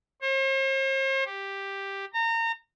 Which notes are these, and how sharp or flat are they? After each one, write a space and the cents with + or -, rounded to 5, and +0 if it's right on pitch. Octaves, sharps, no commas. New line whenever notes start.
C5 +45
G4 +5
A#5 -30